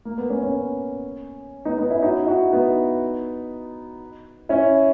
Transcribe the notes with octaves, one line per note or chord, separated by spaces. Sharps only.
A#3
B3
A#3 C#4
A#3 C#4
B3 D#4
B3 D#4
C#4 E4
D#4 F#4
E4
D#4 F#4
B3 D#4
C#4 E4